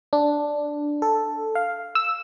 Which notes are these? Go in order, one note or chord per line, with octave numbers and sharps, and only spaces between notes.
D4
A4
F5
E6